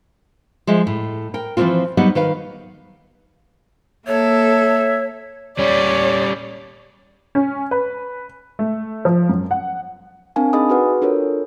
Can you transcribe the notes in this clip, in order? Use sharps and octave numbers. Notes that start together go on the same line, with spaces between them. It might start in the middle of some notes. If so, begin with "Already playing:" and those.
F3 G#3 D#5 E5
A2
A#4 G5
E3 F3 G3 A#3 C4 F4
F#3 G3 B3 D#4 D#5 F#5
D#3 B4 F5
A#3 A4 C#5 E5
G3 C#4 C#5 D5
C#4
B4
A3
F3
F#2
F#5
C4 D4 A#4 F5 G#5 A5
D#4 G#4 D#5 G#5 B5 D#6
F#4 G#4 B4 F#5
D4 F4 A4 A#4 C#5